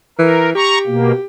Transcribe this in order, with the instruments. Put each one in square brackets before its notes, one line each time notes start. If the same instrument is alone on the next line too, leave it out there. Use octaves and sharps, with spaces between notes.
[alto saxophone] E3 [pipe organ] A#4
[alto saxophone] G4 [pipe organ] A#5 C#6
[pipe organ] B2 A#3